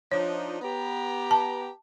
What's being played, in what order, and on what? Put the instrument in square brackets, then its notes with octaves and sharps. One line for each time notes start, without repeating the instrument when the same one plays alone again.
[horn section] F3 D4 D#4 [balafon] C#5
[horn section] B3 G4 A#5
[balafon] A5